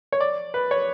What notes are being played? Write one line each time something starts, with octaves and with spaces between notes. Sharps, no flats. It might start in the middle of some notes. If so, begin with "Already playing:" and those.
C#5
D5
B4
C#5